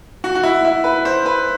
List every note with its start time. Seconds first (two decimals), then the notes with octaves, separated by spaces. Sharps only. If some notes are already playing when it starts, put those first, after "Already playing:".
0.24 F#4
0.35 F#4
0.43 E4
0.65 E4
0.84 B4
1.05 C5
1.26 B4